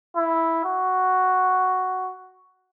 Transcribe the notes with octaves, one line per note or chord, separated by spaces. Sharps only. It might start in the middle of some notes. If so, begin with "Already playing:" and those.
E4
F#4